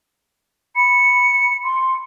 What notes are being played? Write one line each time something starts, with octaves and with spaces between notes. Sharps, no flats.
B5 C#7
C6